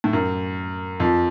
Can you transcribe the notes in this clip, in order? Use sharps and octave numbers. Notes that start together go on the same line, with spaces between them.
A2
F#2
F2